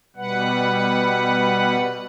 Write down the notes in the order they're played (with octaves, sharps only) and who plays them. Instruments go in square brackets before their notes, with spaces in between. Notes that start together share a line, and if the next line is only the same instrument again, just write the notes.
[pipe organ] B2 G3 B4 F#5